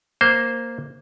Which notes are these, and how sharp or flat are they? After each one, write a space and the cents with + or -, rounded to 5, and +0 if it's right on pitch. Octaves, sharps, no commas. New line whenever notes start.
A#3 +0 C5 +0